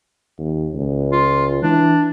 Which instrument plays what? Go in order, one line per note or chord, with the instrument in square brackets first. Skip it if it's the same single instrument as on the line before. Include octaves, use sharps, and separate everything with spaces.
[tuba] D#2
C#2
[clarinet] F4
[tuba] E3 [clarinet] D4